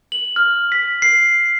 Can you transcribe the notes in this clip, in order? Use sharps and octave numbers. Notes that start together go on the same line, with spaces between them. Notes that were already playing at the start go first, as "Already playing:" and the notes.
F#7
F6
B6
C7